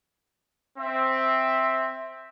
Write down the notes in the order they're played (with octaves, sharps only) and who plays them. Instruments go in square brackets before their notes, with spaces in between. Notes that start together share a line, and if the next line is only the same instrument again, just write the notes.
[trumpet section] C4 E5